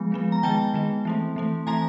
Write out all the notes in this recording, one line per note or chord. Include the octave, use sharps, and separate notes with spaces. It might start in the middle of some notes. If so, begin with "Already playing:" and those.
Already playing: F3 G#3 B3
F3 G#3 B3
A#5
D#3 G#3 B3 G5 A5
D#3 G#3 B3
E3 A3 C4
E3 A3 C4
E3 A3 C4 G#5 A#5